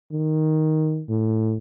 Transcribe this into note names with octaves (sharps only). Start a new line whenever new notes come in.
D#3
A2